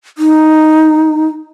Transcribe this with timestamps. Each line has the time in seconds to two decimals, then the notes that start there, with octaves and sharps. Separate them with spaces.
0.18 D#4